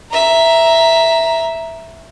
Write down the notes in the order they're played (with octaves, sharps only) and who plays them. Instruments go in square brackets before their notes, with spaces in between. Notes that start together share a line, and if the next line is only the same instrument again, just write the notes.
[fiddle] E5 A#5